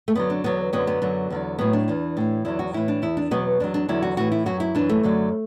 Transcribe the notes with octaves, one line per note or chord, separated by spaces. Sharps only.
A3
F#2 D3 F#3 B3
D4
E2 D3 F#3 B3
F#2 D3 F#3 B3
B3
F#2 D3 F#3
E2 D3 F#3
A2 F#3 B3
D4
E2 E3
A2 E3
E2 D3 F#3 E4
F#4
A2 E3 E4
D4
E2 E3 E4
D4
E2 B2 F#3 B3
E2 D3 F#3 D4
D4
E2 D3 F#3 E4
F#4
A2 E3 F#4
E4
F#2 F#3 F#4
E4
F#2 E3 D4
A3
F#2 D3 F#3